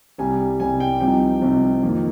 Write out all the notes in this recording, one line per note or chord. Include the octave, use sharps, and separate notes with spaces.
C2 C3 G3 G#5
C2 C3 G3 G#5
G5
C2 C3 F3 C4 D#4 G5
C2 C3 F3 C4 D#4
F2 D#3 A#3 F4